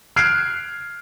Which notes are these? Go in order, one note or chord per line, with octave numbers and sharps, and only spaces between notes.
F6 F#6 G#6 C7 D7